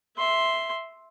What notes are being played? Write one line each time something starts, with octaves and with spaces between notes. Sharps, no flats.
E5 C6